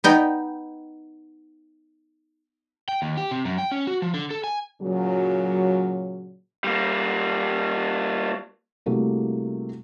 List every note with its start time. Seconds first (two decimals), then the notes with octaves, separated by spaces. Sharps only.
0.04 B3 D#4 G5
2.88 G5
3.02 D#2
3.17 G4
3.31 C3
3.45 F#2
3.58 G5
3.72 C#4
3.87 F#4
4.02 F3
4.14 D3
4.31 A4
4.44 G#5
4.82 A#2 C#3 F#3
6.64 G3 A#3
8.86 C3 G3 A3 A#3 E4 F#4